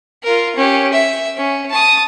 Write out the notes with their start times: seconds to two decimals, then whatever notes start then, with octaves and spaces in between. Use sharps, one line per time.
0.24 F4 A#4
0.56 C#4 G4
0.93 E5
1.38 C#4
1.70 A5 D#6